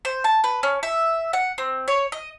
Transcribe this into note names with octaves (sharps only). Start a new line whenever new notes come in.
C5
A5
B4
C#4
E5
F#5
C4
C#5
D#5